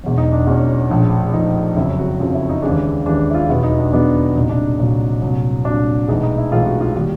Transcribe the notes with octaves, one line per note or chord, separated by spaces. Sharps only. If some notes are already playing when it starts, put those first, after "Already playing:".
E1 E2 B2 F#3
D#4
D4
E1 E2 B2 F#3 C#4
A#1 A2 F3
A#1 A2 F3 D#4
F#1 F2 C#3 F#3 E4
F#4
F#1 F2 C#3 F#3 F4
E4
D#4
D#2 C#3 E3 G#3 D4
D#2 C#3 E3 G#3 D4
E4
F4
E2 B2 F#3 B3 E4
D#4
D4
E2 B2 F#3 B3 D4
C2 A#2 F#3 D#4
D4
C2 A#2 F#3
C2 A#2 F#3
C2 A#2 F#3 D4
B1 A2 E3 G#3 D#4
D#4
E4
B1 A2 E3 G#3 F4
F#4
F4
D#3 G3 A#3 F#4